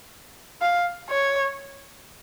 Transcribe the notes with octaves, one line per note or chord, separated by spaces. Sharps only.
F5
C#5